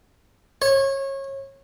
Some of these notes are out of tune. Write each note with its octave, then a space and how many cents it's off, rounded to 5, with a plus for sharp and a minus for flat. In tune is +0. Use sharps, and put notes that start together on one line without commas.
C#5 -25